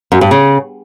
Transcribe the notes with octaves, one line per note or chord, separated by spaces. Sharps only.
F#2
G2
C#3